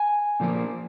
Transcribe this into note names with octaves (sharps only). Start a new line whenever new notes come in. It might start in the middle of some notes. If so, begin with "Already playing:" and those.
Already playing: G#5
A#2 F3 A#3